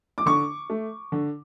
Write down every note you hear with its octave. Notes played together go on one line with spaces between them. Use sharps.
D6
D3 C#6
A3
D3